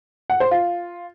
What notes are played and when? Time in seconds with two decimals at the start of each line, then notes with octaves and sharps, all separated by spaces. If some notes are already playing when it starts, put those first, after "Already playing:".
0.30 F#5
0.40 C5
0.51 F4